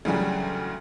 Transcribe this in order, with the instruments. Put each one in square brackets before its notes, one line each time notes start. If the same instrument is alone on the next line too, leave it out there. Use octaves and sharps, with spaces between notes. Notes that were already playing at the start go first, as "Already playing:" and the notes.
[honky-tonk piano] D2 C#3 E3 F#3 G3